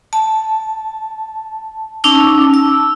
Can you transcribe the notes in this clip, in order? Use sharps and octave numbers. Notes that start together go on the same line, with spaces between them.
A5
C#4 D#4 A5 D6 E6
E6